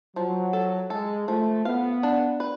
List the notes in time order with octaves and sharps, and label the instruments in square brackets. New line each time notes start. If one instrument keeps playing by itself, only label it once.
[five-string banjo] F3 [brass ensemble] F#3
[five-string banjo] A4
[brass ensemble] G#3 [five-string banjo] A4
[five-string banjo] F3 [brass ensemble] A3
[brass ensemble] B3 [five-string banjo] F5
[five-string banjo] D4
B4